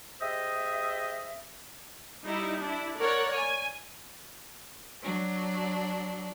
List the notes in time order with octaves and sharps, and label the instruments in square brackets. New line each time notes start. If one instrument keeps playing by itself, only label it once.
[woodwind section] G4 G#4 C5 D#5 E5
[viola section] G3 D#4 E4
D4 E4
A#4 C#5 D5 F#5
G#5
[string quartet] F#3 D4